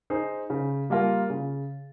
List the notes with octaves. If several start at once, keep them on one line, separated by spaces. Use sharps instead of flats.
D#4 G#4 C5
C#3
G3 A#3 F4 A#4
C#3